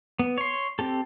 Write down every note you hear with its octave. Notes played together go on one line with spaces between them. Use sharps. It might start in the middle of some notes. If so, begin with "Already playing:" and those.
B3
C#5 C6
C4 G4 A4